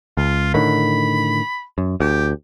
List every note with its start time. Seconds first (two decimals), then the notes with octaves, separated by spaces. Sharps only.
0.17 C#2 F4
0.54 A2 D3 D#3 B5
1.78 F#2
2.00 D2 G4